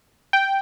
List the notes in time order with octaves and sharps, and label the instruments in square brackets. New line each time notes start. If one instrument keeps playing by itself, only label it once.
[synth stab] G5